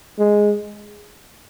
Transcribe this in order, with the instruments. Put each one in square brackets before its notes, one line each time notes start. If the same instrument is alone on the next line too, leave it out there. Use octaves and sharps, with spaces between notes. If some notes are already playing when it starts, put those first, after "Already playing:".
[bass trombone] G#3